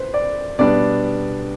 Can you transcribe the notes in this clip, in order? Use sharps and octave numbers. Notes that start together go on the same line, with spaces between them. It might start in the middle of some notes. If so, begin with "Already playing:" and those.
Already playing: B4 C5
D5
B2 G3 B3 D4 D5